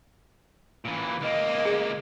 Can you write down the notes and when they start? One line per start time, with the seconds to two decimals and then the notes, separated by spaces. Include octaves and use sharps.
0.85 A#2 E3
1.21 C#2 A#3 D#5
1.65 G#4